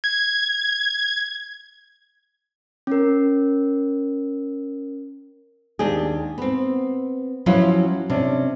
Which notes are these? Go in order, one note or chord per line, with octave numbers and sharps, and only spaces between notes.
G#6
C#4 A#4
D#2 D4 G4 G#4
B3 C4
F3 F#3 C#4 E4 F4 B4
C3 C#4 D4